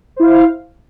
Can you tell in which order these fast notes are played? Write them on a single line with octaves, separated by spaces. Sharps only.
C5 E4 F5